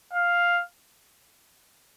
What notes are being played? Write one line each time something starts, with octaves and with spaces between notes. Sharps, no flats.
F5